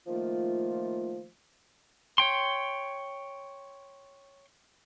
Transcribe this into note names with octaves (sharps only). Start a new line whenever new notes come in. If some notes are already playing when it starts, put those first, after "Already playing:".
D#3 F3 A3 A#3 F4
C#5 G5 C6